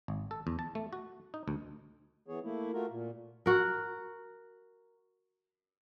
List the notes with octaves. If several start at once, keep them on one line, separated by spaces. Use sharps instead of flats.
G#1
A4
E2
A5
A3
F#4
D#4
D2
E3 B3 G#4 C#5
A3 A#3 E4
A3 F4 F#4 A#4
A#2
F#4 A#4